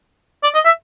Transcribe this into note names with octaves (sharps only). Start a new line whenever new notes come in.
D5
D#5
E5